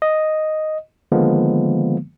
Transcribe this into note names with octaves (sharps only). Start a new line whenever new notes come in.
D#5
D3 D#3 F3 G#3 A#3 B3